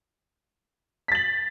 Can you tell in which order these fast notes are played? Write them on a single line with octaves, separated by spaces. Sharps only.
B6 A6 F#7